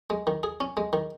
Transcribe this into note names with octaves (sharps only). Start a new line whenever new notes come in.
G#3
D#3
G#4
C#4
G#3
D#3